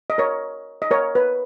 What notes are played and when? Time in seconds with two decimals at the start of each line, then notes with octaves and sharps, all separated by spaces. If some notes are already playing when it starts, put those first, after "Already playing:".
0.10 D#5
0.18 A#4 C#5
0.82 D#5
0.91 A#4 C#5
1.15 B4